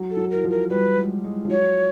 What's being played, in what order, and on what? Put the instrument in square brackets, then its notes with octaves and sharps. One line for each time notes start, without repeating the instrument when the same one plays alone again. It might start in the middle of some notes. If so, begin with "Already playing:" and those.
Already playing: [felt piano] F#3
[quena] A4
[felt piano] F#3
[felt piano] E3 [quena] A#4
[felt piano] F3
[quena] A#4
[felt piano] G3 [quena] B4
[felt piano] G#3
G#3
F3
[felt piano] F#3 [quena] C#5